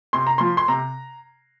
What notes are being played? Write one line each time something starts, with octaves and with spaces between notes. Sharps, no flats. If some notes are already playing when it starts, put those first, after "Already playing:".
C3 C6
A#5
F3 C6
C6
C3 A#5